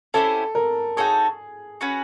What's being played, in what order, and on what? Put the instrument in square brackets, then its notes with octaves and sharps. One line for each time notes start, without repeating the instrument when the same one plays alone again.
[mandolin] C#4 E4 G4 C5 [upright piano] A4
[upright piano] A#4
[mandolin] D#4 F#4 A4 C#5 [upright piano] G#4
[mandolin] C#4 F#4 B4